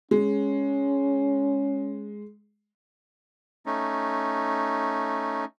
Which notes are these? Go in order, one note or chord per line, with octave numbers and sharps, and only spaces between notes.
G#3 C#4
A3 C#4 D#4